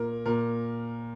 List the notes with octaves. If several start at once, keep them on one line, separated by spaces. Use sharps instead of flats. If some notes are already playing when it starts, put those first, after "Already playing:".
Already playing: A#2 A#4
A#2 A#4